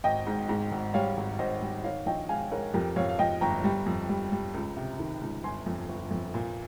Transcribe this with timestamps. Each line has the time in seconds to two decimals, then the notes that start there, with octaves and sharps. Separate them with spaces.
0.04 G#1 D#5 G5
0.26 G#2
0.49 G#2
0.71 G#1
0.94 G3 C#5 F5
1.17 G#1
1.39 G#1 C5 D#5
1.62 G3
1.84 D#3 C#5 F5
2.06 A#1 D#5 G5
2.29 G#2 F5 G#5
2.51 G#2 A#4 C#5
2.74 F2 G4 A#4
2.96 F2 C#5 F5
3.09 F5
3.19 F3 D#5 G5
3.41 G1 G5 A#5
3.64 G3
3.86 F2
4.09 G3
4.32 G3
4.54 C#2
4.76 C3
4.99 D#3
5.21 C#2
5.44 G1 G#5 C6
5.66 F2
5.89 G1
6.11 F2
6.34 A#2